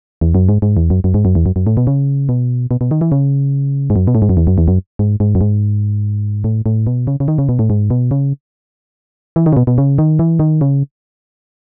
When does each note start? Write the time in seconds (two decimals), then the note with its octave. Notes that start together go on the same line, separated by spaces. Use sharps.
0.21 E2
0.35 F#2
0.49 G#2
0.62 G#2
0.77 E2
0.90 F#2
1.04 F#2
1.14 G#2
1.25 F#2
1.35 E2
1.46 F#2
1.56 F#2
1.67 A2
1.77 B2
1.87 C#3
2.29 B2
2.71 B2
2.81 B2
2.91 D#3
3.01 E3
3.12 C#3
3.90 G#2
3.96 F#2
4.07 B2
4.15 A2
4.22 G#2
4.29 F#2
4.37 E2
4.47 F#2
4.58 E2
4.68 F#2
4.99 G#2
5.20 G#2
5.35 F#2
5.41 G#2
6.44 A2
6.66 A2
6.87 B2
7.07 C#3
7.20 C#3
7.28 D#3
7.38 C#3
7.49 B2
7.59 A2
7.70 G#2
7.90 B2
8.11 C#3
9.36 E3
9.46 D#3
9.53 C#3
9.57 B2
9.67 B2
9.78 C#3
9.98 D#3
10.19 E3
10.39 D#3
10.61 C#3